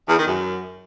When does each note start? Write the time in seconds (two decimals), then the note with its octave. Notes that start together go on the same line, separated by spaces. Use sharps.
0.08 E2
0.18 D#3
0.27 F#2